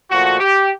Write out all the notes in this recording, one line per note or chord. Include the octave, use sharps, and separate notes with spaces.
A#2 F3 A3 F#4
G4